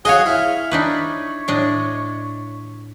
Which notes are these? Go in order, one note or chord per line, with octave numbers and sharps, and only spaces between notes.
F#4 G#4 C#5 D#5 F5 F#5
E4 F5
D4 D#4 B4 C#5
A2 D4 D#5